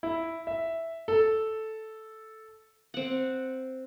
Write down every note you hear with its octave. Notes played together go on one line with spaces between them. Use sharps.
E4
E5
A4
C4 F#5